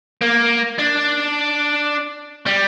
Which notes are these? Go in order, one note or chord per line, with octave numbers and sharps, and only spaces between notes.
A#3
D4
G3